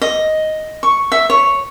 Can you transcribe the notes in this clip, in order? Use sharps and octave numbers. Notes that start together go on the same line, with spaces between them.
D#5
C#6
E5
C#5